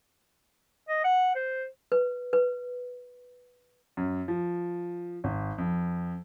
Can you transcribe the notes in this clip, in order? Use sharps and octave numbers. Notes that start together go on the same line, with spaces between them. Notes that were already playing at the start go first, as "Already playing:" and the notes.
D#5
F#5
C5
B4
B4
F#2
F3
G#1
F2